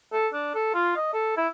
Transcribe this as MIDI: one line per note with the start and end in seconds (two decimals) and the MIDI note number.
0.13 0.28 69
0.33 0.52 62
0.55 0.74 69
0.74 0.94 65
0.96 1.12 75
1.14 1.33 69
1.37 1.48 64